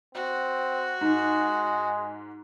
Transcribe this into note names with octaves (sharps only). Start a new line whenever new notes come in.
C4 F#4
G#2 G#3